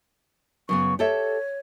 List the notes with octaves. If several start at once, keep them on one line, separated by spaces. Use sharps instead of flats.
F#2 C#3 B3 C#6
G4 A4 C#5 E5